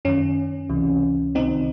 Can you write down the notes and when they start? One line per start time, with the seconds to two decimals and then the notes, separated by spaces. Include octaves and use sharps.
0.05 F#2 D#3 C#4
0.69 C#2 C3 E3
1.35 C2 C3 D#3 C4 D#4